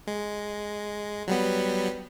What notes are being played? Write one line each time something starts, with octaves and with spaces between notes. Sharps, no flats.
G#3
F#3 G3 B3